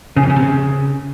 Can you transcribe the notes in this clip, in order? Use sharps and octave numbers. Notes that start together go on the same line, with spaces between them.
C#3
F2
C#3
C3
C#3